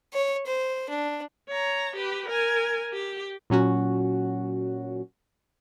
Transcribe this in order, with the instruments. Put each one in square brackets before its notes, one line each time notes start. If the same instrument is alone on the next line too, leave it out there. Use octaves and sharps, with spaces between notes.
[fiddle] C#5
C5
D4
[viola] C#5 A#5
G4 B4
A#4 G#5
G4
[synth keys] A#2 F#3 C#4 F#4